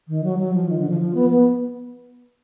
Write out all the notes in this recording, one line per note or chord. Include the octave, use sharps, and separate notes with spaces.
D#3
F#3
F#3
F3
D#3
D3
F3
F3
B3
B3